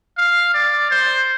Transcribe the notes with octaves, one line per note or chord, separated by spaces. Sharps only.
F5
D5
C5